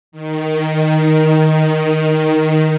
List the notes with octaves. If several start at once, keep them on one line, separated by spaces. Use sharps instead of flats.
D#3
D#3